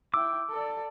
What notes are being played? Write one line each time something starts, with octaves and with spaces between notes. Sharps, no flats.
E4 G5 D6 E6
A4 D5